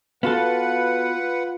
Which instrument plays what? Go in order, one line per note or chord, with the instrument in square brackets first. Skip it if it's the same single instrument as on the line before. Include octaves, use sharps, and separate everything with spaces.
[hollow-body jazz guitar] B3 F#4 A4 [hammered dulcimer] F4 [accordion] B4 F#5